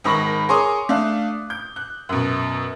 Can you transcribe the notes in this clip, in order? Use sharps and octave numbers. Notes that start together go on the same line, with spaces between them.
G#1 D#3 B5 C#6 A#6 F#7
G#4 A#4 C#5 C6 D6 D#6
A3 D4 F5 F#6
G6
F#6
F#2 B2